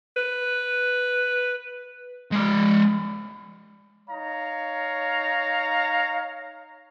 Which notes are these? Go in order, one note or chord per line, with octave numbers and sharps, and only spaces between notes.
B4
G#3 D5
D#4 C#5 F5 A#5